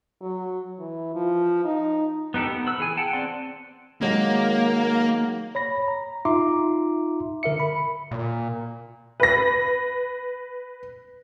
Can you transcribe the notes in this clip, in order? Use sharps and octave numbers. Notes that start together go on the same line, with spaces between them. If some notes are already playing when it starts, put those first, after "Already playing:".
F#3
E3
F3
D#4
B3 D#4 G4 A4
B3
B4 E6
E3 G#4 G#5
F#5 G5 A5
C4 D5 F#5 C6
D#3 F#3 G#3 A#3
C#5 B5 A#6
A#5
D#4 F4 E5 A#5 C6 D6
D3 A#4 E5 C#7
B5
A#2
B4 A#6